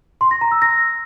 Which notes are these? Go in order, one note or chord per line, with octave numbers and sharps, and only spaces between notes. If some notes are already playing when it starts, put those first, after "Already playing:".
C6
A#6
A#5
E6
A#6